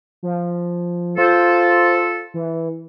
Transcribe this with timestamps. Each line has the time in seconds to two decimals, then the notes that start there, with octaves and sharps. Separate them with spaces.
0.23 F3
1.18 F4 A4 C5
2.34 E3